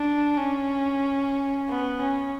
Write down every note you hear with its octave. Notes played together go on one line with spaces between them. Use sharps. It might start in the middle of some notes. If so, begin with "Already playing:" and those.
Already playing: D4
C#4
B3
C#4